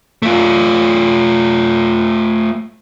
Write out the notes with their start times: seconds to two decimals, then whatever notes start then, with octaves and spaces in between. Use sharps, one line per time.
0.22 A3 F4